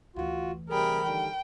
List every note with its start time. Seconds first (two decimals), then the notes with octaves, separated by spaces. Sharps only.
0.16 D2 E3 F4 F#4
0.70 C3 G3 G#4 A#4 G5 B5
1.02 D3 D#3 G3 G5